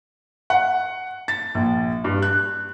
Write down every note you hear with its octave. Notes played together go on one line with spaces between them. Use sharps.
F#5
A6
A#1
G2
F#6